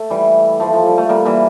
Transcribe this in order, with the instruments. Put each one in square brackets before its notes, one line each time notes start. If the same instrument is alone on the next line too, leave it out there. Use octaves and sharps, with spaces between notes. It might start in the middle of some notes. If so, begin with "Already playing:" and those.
Already playing: [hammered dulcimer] A3
E3 G3
F3 A3
F3
G3
A3
G3 A#3
E3 G3